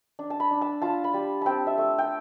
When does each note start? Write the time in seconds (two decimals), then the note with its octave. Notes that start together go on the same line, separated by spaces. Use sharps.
0.19 D4
0.30 A5
0.40 B5
0.51 D4
0.61 A5
0.82 F4 A5
1.04 B5
1.14 G3
1.41 C4 G5 A5
1.67 E5
1.78 A3
1.98 G5